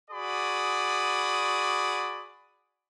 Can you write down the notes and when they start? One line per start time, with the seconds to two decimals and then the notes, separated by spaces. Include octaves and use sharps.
0.11 F#4 G#4 D5 B5 D#6